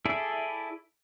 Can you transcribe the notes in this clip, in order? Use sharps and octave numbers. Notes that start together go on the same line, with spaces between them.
E4 G#4 A4 D5 E5